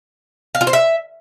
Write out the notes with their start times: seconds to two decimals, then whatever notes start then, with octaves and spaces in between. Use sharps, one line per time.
0.55 F5
0.61 F4
0.67 C5
0.73 E5